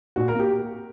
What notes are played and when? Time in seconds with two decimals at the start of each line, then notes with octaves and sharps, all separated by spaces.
0.16 A#2 F#4
0.28 A#4
0.34 A#3
0.39 G4